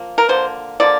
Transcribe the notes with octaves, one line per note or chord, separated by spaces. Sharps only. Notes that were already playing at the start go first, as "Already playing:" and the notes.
Already playing: F3 A#3
A#4
D3 F3 A#3 C5
D3 F3 A#3 D5